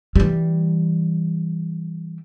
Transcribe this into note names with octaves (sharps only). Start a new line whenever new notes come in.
E3 G3